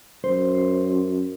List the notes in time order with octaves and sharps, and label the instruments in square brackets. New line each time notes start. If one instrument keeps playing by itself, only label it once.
[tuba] F#2 [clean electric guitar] C5